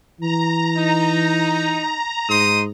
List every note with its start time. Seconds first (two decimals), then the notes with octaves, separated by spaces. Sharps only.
0.21 E3 A#5
0.76 D#4
2.29 G#2 D#4 C6 D#6